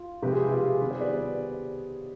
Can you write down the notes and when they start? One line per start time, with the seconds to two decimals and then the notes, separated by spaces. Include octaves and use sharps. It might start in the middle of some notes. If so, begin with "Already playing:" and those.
Already playing: F4
0.23 C3 F3 G#3 G4 B4
0.32 F4 G#4
0.43 G4
0.52 F4 G#4
0.81 D#3 G3 B3 G4 B4
0.91 G#4 C5
1.01 B4 D5